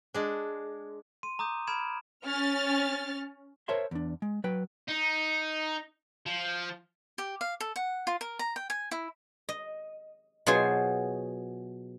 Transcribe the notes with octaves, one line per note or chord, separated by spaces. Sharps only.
G#3 D4
C6 D#7
A#5 D6 D#6 G6
B5 F6 G#6 D7 E7
C#4 F6 A6
A#4 C5 C#5 E5 A5 C6
E2 D4
G#3
F#3 B4 G5
D#4
F3
G4
F5
A4
F#5
F4
A#4
A#5
G5
G#5
E4
D#5
B2 F#3 F4 G#4 C5 G#5